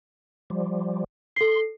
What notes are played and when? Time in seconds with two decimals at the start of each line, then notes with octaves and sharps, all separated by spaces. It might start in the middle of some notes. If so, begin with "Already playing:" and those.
0.50 F3 G3
1.36 A4 C6 C7